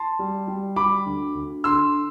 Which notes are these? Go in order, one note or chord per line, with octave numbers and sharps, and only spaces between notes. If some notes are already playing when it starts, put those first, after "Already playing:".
Already playing: A5 C6
G3
G3
G3 B5 D6
D2
D2
D3 C6 E6